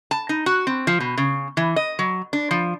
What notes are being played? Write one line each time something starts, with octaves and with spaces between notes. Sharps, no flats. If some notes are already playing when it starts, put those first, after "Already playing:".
A5
D#4
F#4
C4
F3
B2
C#3
E3
D#5
F#3
D4
F3